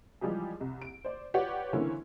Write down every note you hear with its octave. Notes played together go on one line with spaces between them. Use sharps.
E3 F3 G3 G#3 G4 G#4
C2
D7
C5 D5
F4 G4 B4 C#5 D5 F#5
D3 E3 A#3 C4 C#4 E4